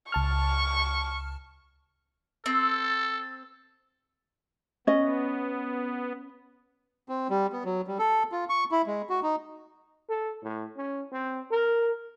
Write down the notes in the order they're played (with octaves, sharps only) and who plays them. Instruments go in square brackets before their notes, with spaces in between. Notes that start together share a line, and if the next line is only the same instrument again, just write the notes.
[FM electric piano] C#2 A5 F6 [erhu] C#6
[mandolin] C4 [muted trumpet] A4
[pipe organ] B3 [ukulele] C#4 D#5
[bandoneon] C4
G3
B3
F#3
G3
A4
F4
C#6
E4
G#3
F#4
D#4
[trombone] A4
A2
C#4
C4
A#4